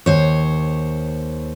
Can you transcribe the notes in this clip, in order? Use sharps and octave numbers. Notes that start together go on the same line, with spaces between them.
D#2 C5 C#5